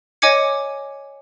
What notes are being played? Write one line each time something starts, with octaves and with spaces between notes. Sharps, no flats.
C#5 D#5 G#5 D6 G#6 C#7